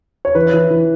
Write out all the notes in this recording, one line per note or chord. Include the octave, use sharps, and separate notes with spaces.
C#5
E3 B4
E3
E3